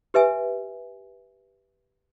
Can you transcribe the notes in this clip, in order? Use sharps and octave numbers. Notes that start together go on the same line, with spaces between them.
G4 B4 E5 G#5